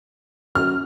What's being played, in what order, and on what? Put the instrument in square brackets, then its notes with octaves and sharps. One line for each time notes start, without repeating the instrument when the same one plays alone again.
[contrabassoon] F#2 [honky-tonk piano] F6